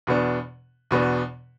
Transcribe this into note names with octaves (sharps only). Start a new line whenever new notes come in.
E2 B2 B3 D4
E2 B2 B3 D4